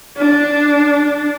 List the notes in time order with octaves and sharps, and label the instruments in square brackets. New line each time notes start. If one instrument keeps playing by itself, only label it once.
[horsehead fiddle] D4